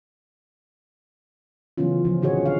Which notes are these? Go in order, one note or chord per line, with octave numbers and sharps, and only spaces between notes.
C#3 E3 F#3 B3 C#4 F4
C#3 F3
A#2 D3 F#4 G#4 C#5
F#3 F5